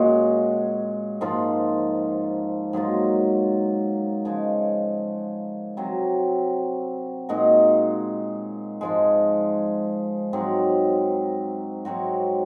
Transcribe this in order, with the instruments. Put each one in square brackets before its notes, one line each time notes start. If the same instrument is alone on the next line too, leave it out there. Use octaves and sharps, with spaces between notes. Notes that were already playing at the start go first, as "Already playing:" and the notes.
Already playing: [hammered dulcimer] A#2 G#3 C#4 F#4
G#2 F3 A#3 F4
G#2 F#3 A#3 F4
C#3 F3 G#3
C3 F#3 C4
A#2 G#3 D#4 F#4
G#2 F3 G#3
G#2 F#3 C4
G#2 F#3 C4 F#4